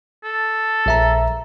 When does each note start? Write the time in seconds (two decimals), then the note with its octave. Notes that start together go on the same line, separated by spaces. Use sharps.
0.24 A4
0.86 A#1 E5 A#5